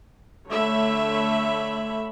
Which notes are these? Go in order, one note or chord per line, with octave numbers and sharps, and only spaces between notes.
D3 A3 C#5 E5 B5